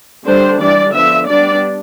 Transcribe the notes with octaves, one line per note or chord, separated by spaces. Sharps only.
D3 G3 D4 C5
E3 G3 D4 D5
D3 F3 B3 D4 E5
G3 B3 D4 D5